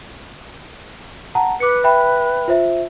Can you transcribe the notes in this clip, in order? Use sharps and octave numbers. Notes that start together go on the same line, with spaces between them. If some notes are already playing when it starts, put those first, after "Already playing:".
F#5 A5 A#5
B4 D6 C#7
E5 G5 B5
F4 C5 E5